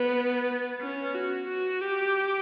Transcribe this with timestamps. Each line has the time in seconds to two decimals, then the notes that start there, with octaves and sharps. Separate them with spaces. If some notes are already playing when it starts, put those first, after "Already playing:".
Already playing: B3
0.81 C#4
1.14 F#4
1.48 F#4
1.81 G4